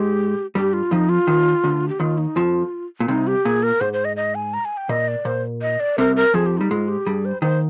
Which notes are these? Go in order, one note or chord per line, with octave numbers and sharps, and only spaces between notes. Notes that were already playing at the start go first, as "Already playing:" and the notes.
Already playing: G#2 G#3 G4
G2 G3 G4
F4
F2 F3 D#4
F4
D#2 D#3
D2 D3
G4
D#2 D#3 F4
D#4
F2 F3 F4
A#2
C2 C3 D#4
G4
A#2 G#4
A#4
G#2 C5
C5
D#5
D#5
G#5
A#5
G#5
G5
A#2 D#5
D5
A#2 C5
D#5
D5
C2 C3 A#4
A#4
F2 F3 G#4
G4
G3 D#4
G#2 G#3 F4
G4
G2 G3 G#4
C5
D#2 D#3 C5